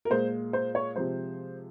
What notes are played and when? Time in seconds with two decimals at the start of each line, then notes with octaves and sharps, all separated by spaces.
0.05 A#4
0.10 A#2 G#3 C5
0.53 C5
0.75 C#5
0.96 C3 F3 G#3 C5